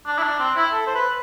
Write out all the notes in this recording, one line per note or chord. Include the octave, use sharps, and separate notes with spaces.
D4
E4
D4
C4
E4
A4
C5
B4